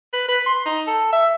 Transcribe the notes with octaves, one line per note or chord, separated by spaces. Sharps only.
B4
B4
C6
D#4
A4
E5